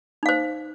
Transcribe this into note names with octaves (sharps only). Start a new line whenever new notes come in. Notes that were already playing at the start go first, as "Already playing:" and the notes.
D#4 C5 F5